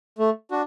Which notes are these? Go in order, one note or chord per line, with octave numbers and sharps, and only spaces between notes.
A3
D4 F#4